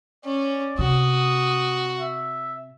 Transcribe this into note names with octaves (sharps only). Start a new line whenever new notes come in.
C#4 D5
C3 F#4 D#6
E5